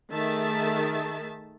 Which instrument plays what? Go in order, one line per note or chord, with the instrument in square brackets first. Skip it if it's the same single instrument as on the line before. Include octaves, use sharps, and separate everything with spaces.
[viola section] D#3 A3 G#4 E5 A5